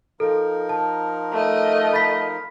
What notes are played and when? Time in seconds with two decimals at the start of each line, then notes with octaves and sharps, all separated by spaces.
0.20 F3 D#4 A4 A#4
0.69 A5
1.31 A3 D#5
1.93 B5 A6 B6